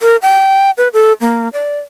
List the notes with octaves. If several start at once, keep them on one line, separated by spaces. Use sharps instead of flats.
A#4
G5
B4
A4
A#3
D5